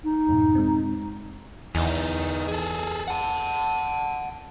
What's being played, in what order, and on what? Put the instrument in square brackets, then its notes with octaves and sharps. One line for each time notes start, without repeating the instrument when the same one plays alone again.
[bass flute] D#4
[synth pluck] F2 G#2 B2
G#3 C4
[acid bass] E2 [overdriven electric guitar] E3 D#4
[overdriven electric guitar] G#4 A4
F#5 A5